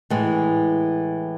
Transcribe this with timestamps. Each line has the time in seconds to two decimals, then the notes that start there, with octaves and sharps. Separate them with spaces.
0.10 A2 E3 G#3